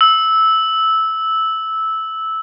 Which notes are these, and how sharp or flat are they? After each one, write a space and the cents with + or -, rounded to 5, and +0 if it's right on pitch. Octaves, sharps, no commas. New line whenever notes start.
E6 -10